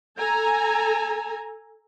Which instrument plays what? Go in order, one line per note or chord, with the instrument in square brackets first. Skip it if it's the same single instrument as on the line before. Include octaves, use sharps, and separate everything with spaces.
[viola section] A4 G#5 A#5